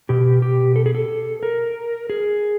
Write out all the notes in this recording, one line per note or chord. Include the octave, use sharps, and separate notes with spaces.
B2 G4
G4
A4
G#4
A4
A#4
G#4